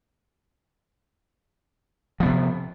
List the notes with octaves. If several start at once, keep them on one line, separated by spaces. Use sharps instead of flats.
C3 F3 B3